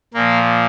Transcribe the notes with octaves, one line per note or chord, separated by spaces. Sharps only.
A#2 F3 A#3